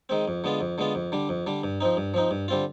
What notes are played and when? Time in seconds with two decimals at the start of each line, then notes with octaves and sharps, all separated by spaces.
0.09 D#3 G#3 C4
0.28 F2
0.44 D3 G#3 B3 F4
0.61 F2
0.78 D3 G#3 B3 F4
0.95 F2
1.12 D3 G3 D4
1.29 F2
1.46 D3 G3 D4
1.63 G2
1.80 F3 C4 D#4
1.97 G2
2.14 F3 C4 D#4
2.31 G2
2.48 D3 G3 C4 F4